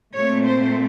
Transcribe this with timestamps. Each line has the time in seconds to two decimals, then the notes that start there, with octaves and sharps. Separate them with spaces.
0.14 A#2 A3 C4 C#5
0.45 C5